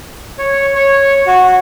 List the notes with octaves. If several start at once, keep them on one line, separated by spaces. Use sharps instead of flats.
C#5
C#5
F#4